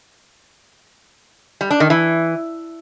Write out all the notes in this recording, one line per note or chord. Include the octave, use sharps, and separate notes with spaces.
G3
D4
D#3
E3